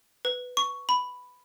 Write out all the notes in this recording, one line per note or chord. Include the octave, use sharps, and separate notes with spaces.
B4
C#6
B5